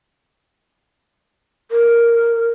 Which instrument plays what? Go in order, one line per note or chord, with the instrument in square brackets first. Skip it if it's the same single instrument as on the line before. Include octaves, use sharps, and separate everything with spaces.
[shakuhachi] A#4